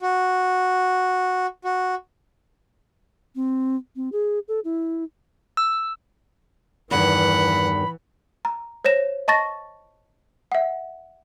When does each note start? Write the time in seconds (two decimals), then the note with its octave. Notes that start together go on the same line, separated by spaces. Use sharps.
0.01 F#4
1.65 F#4
3.35 C4
3.96 C4
4.12 G#4
4.48 A4
4.64 E4
5.57 E6
6.91 E2 G2 D#3 E3 F#5 B5
8.45 A#5
8.85 C5 C#5 A#6 E7
9.28 D#5 A5 C#6 A6 A#6
10.52 E5 F#5